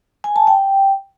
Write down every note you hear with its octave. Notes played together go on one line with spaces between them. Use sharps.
G#5
A5
G5